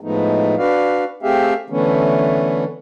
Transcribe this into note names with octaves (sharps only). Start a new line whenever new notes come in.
A2 F3 G#3 A3 B3 D#4
D4 F#4 B4 D5 F5
A3 C4 G4 G#4 E5 F5
D3 E3 A3 B3 C#4